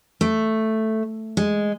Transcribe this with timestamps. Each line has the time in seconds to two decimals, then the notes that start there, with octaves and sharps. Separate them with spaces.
0.21 A3
1.37 G#3